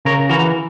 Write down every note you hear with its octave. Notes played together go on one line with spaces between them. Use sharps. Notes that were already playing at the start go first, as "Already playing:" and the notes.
C#3 A#4 C#5
E3 F#4 A#4